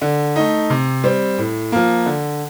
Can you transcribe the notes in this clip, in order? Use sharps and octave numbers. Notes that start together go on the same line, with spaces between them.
D3
A3 D#4
C3
G3 C4
A2
F3 A#3
D3